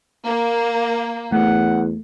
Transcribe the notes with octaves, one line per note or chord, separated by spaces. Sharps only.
A#3
E2 A3 F#5